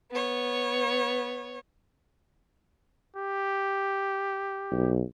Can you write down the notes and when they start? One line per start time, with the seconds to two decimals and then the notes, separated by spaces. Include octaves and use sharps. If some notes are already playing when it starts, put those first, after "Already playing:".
0.11 B3 C#5
3.17 G4
4.72 B1